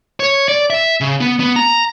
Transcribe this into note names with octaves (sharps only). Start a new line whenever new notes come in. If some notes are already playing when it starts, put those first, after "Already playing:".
C#5
D5
E5
C#3
B3
B3
A#5